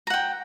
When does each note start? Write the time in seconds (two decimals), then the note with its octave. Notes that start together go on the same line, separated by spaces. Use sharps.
0.07 A#5
0.10 F#5
0.14 G5